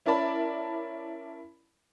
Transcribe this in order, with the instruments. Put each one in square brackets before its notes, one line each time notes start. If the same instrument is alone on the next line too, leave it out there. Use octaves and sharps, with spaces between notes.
[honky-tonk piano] C#4 E4 A#4 D5 A5 B5